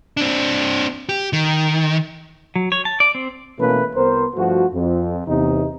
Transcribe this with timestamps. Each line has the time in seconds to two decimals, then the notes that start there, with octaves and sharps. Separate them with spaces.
0.17 C4 D4
1.09 G4
1.33 D#3
2.55 F#3
2.72 C#5
2.85 A5
3.00 D5
3.15 C4
3.58 B2 E3 A3 A#3 C#4 B4
3.95 C2 B3 A#4 C5
4.36 G2 F3 A3 F#4
4.74 F2
5.27 E2 C3 D#4